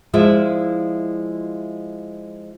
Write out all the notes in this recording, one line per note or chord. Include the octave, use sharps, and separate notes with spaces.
F3 G#3 E4 F4 D5 E5